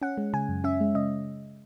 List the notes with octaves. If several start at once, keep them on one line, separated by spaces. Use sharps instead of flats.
C#4 F#5
G#3
C#3 G#5
F#2
C#4 E5
G#3
C#3 D#5